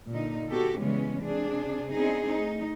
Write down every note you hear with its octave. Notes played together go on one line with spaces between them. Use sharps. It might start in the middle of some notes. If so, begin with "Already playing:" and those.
A#2 D3 D#4
B3 F#4 G4 A4
C#3 E3 G3 G#3 B3 C#4
C3 D4 G#4
B3 C4 D4 D#4 G#4
A3 D#4